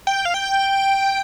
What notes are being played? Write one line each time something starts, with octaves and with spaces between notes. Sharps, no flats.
G5
F5
G5